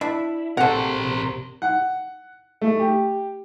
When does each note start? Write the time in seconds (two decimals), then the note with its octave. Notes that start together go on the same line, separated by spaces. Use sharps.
0.01 D4 E4
0.57 C3 A4 A#4 C5 F#5
1.62 F#5
2.61 A3
2.79 G4